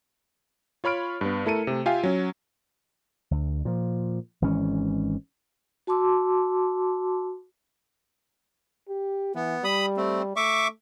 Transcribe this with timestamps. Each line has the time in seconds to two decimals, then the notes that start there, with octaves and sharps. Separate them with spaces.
0.84 F4 C#5 B5 F6 D7
1.21 G2 B3
1.45 A3 E4 A4 A#4 C#7 D#7
1.67 C3 A3
1.86 F4 G4 E5 F5 G#5
2.03 F#3 C#4
3.31 D2
3.65 A#2 F3
4.42 G#1 E3 G#3 C#4
5.87 F#4 A5 C6 D6 E6
8.89 G4
9.35 E3 B3
9.64 G3 B5 D#6
9.97 A3 C4
10.36 A3 E5 C#6 D6